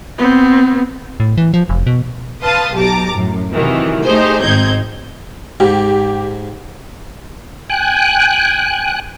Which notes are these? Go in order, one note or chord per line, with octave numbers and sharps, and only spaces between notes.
B3 C4
A2
E3
F3
F1
B2
B4 F5 A5 C6 D#6
B1 G4 A5 A#5 D6
F#2 A2
C3 D#3 E3 F#3
A3 D#4 G4 G#4 C5
G#1 C4 D#4 G6 G#6
G#2 G4
G5 G#5 F#6